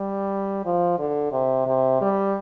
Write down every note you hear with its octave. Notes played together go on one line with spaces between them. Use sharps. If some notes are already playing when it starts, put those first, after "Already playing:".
Already playing: G3
F3
D3
C3
C3
G3